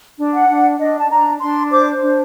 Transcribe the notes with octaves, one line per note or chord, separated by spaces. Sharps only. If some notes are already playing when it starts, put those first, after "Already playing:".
D4
F#5
D4
D4 D#5
A5
D4 A#5
D4 C6
C5 D6
D4